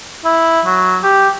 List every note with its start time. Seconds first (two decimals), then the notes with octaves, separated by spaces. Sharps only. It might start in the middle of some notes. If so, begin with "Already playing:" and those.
0.25 E4
0.65 F#3
1.03 G4